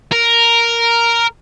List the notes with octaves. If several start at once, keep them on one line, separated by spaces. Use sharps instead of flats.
A#4